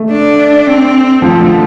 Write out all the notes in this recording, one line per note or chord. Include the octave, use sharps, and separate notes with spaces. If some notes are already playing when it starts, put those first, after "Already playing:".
Already playing: A3
D4
C4
F3 A3
D3